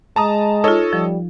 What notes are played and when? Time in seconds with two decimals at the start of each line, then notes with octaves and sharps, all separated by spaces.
0.16 G#3 A5 A#5 D#6
0.64 D#4 F4 A4 C#5 D#5
0.93 F3 G3